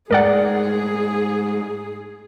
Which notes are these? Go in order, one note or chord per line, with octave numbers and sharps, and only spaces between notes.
G#2 G#3 A3 G#4 A#4 D5 F#5